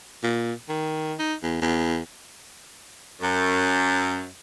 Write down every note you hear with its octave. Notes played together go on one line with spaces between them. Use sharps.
A#2
D#3
D#4
E2
E2
F#2